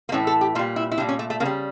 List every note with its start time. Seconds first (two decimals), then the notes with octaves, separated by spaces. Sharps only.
0.09 A#3
0.12 A2 E3 A3 C#4
0.27 A4
0.41 G4
0.55 A#2 G3 F4
0.76 E4
0.91 E4
0.98 A#2 G3 D4
1.09 C#4
1.19 A3
1.30 A3
1.40 C#3 A#3
1.45 G3